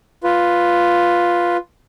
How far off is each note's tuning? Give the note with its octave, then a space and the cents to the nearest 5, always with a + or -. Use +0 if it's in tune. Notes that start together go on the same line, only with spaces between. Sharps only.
F4 +0 B4 +0